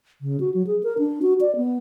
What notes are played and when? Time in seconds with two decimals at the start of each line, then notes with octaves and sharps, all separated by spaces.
0.21 C#3
0.40 F#4
0.54 F#3
0.67 G#4
0.83 A#4
0.98 D4
1.22 F#4
1.41 D5
1.56 B3